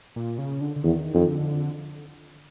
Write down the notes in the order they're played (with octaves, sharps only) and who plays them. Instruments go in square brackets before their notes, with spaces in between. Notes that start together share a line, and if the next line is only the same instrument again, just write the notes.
[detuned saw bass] A#2
C#3
D3
D3
[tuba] E2 [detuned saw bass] D#3
[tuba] F2
[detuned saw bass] D3